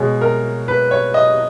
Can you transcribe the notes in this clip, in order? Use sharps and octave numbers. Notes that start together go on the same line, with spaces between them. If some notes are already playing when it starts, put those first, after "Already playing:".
Already playing: B2 G#3 C#5
A#4
B4
C#5
D#5